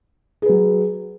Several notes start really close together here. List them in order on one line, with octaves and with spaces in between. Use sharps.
G#4 B4 F#3